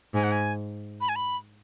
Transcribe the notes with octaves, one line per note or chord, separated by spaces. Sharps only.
G#2 G#5
F#5
G#5
B5
G#5
B5